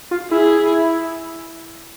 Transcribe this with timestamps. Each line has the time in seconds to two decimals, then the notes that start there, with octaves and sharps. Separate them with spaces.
0.11 F4
0.31 E4 G#4